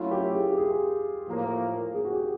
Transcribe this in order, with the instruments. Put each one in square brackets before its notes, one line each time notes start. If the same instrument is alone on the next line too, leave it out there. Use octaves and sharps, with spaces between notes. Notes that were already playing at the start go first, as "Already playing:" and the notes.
Already playing: [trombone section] F#3 A3 C#4 E4 [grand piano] F4
[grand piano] G4
G#4
G4
G#4
[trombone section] A2 F3 A#3
[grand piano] G#4
F#4
G4